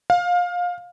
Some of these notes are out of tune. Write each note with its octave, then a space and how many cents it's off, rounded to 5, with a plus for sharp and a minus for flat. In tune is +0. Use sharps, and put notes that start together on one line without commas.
F5 +25